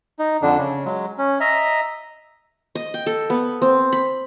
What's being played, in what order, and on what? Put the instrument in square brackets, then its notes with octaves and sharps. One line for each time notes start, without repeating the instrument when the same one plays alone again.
[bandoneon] D#4
F2 D3 D4
C#3
F#3 G#3
C#4
D#5 E5 A#5
[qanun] D#5
G5
A4
B3
C4
B5